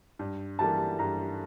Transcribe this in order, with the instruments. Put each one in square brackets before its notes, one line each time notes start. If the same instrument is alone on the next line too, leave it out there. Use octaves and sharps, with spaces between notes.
[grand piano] G2
[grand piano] E3 G3 A#3 [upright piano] A5
[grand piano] G2 [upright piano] A#5